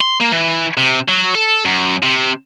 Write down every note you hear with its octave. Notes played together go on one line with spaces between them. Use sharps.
C6
A#3
E3
C3
F#3
A4
F#2
C3